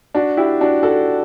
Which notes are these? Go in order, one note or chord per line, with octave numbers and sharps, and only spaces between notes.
D4 F#4
E4 G4
D4 F#4
F#4 A4